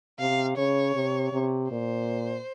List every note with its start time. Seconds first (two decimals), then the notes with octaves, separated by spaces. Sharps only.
0.19 C3 F5
0.57 C#3 C#5
0.95 C3
1.33 C3
1.71 A#2 C5